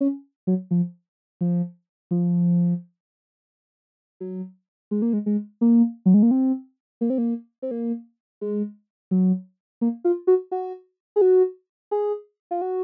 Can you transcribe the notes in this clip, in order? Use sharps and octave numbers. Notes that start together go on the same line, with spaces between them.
C#4
F#3
F3
F3
F3
F#3
G#3
A#3
G#3
G#3
A#3
F#3
G#3
A#3
C4
A#3
C4
A#3
C4
A#3
G#3
F#3
A#3
F4
F#4
F#4
G#4
F#4
G#4
F4
F#4